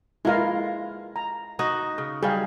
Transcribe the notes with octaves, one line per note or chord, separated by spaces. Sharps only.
G#3 E4 F4 A#4 F5
A#5
D#4 F#4 D#5
C#3
F#3 G3 G#4 F5